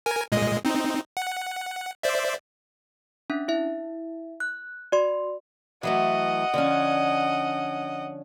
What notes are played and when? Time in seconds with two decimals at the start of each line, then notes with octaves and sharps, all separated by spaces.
0.06 A#4 G#5
0.32 A#2 G#3 D#5
0.65 C4 D#4
1.17 F#5
2.03 C5 D5 E5
3.30 C#4 D4 E5
3.48 E4 E5
4.40 F#6
4.92 F#4 D5 C6
5.83 E3 F#3 A3 D#5 F#5
6.54 D3 F3 C#4